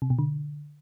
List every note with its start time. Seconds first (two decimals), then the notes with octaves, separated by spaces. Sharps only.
0.02 C3
0.10 B2
0.19 D3